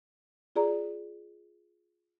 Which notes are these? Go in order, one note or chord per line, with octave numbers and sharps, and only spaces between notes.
F4 G#4 D5 A#5